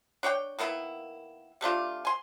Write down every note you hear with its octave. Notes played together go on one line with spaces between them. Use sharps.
D4 C#5 F#5 G5
D#3 A#3 B3 E4
G3 A3 D4 F4
G#5 C6